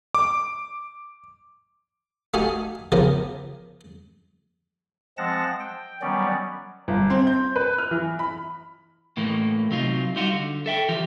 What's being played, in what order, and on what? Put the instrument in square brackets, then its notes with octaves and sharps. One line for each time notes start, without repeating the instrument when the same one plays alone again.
[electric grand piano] D6
[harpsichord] A3 D#4 F#4 G4 F5 G#5
C#3 E3 F3 B3 G4 A#4
[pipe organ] F3 G#3 C4 F#5 A5 A#6
G5
D#3 F#3 G3 B3 C#4 D5
[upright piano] G1
C4
G6
B4
F6
E3
B5
[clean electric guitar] A2 E3 A3 A#3
C3 F#3 D#4 F4
G3 D#4 F4 F#4
D3
A4 E5 G5
E3 F4 G4